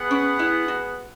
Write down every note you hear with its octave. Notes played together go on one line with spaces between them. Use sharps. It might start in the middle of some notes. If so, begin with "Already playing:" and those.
Already playing: B3 G#4 B4 F#5
C#4
E4
F#4